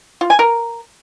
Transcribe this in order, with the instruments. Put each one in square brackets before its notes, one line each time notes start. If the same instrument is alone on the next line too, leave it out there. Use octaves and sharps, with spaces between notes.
[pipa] F4
G#5
A#4